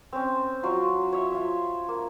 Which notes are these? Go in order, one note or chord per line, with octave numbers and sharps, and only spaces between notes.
C4 C#4
F#3 F4 C#6
C#5 E5
F4 E5
A#3